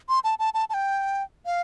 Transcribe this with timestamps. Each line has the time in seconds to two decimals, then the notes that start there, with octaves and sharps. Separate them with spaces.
0.09 C6
0.24 A5
0.39 A5
0.54 A5
0.70 A5
0.74 G5
1.46 F5